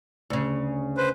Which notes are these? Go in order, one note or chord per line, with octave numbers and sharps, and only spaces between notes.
D2 C#3
B4 C5